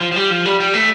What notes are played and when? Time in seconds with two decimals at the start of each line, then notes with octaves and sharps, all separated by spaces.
0.01 F3
0.12 F3
0.16 G3
0.30 F3
0.45 G3
0.60 G3
0.74 A3